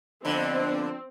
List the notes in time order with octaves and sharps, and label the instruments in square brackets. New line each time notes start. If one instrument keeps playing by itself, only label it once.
[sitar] F2 D3 [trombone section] F3 B3 D4 [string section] C4